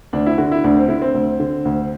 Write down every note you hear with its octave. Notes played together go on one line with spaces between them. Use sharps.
D2 D4
E4
D3 F#4
E4
D2 D4
C4
D3 E4
C4
D2
D3
D2